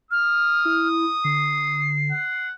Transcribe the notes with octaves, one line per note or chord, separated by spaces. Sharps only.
D#6 F6
E4
D3 C7
F#5